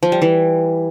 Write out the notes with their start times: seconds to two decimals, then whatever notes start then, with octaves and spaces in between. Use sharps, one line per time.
0.03 F3
0.12 G3
0.22 E3